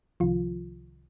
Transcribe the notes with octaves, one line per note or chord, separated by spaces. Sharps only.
C2 C3 D#3 F3 F4